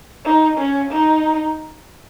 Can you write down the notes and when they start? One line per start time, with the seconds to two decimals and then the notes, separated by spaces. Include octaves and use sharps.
0.25 D#4
0.58 C#4
0.91 D#4